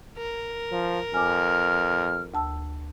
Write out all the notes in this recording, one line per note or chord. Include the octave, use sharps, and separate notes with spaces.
A#4
F3
F2 G#5 D6 F6
D2 A5 E6